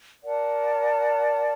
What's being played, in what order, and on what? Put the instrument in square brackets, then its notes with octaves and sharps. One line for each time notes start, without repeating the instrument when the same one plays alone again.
[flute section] A#4 D5 F#5 A5